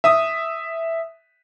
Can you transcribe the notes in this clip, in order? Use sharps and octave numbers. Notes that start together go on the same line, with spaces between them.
E5 D#6